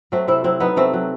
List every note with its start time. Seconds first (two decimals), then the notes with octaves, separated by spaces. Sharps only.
0.12 F#3 A3 C4
0.28 C3 C4 E4
0.44 F#3 C4 E4
0.60 F#3 B3 D#4
0.76 C3 A3 C4
0.93 F#3